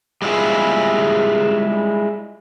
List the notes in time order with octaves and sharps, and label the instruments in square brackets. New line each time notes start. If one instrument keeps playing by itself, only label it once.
[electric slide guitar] G3 G#3 E4 F4 G#4